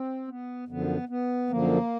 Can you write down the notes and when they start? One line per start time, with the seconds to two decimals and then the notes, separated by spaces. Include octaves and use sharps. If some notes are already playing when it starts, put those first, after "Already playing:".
Already playing: C4
0.28 B3
0.68 F#2 D3 F3 B3
1.09 B3
1.50 F#2 D3 F3 A#3